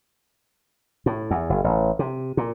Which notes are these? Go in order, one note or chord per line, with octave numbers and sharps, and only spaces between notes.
A2
E2
F#1
A1
C3
A#2